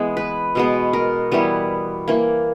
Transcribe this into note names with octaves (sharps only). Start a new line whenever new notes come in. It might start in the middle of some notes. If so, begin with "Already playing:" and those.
Already playing: E3 G#3 B3
B4
B2 G#3 B3
A#4
E3 G3 B3
E3 A#3